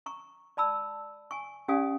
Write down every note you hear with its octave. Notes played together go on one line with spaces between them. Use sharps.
A#5 C#6
D5 A5 B5 E6
G#5 C#6
C#4 G4 D5 F5 G#5 D#6